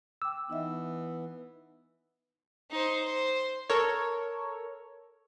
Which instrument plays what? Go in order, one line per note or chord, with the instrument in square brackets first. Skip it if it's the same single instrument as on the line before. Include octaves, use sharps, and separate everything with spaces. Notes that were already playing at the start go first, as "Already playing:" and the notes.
[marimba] G5 D6 [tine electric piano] E6
[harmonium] E3 B3 [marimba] D#4 D#5 E5
[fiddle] D#4 C5
C5
[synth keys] A4 A#4 C#5